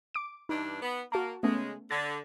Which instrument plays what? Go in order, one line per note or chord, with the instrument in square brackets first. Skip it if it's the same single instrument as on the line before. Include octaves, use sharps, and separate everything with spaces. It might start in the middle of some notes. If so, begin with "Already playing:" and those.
[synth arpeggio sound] D6 D7
[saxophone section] G2 E3 D4 [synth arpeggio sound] D#4
[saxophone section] B3
[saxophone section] A#3 [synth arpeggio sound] F#4 A5
[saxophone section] C#3 G#3 [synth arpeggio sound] A3 B3 C#4
[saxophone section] D3 [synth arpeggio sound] G#6 A6